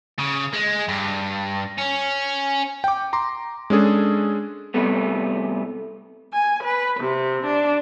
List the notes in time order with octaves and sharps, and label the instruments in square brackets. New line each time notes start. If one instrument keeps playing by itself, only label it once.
[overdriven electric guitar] C#3
G#3
G2
C#4
[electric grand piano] G5 D6
A#5 C6 D6
G#3 C#4 D4 G#4 A4
[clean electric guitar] C3 G3 A3 B3
[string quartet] G#5
B4
C3
D4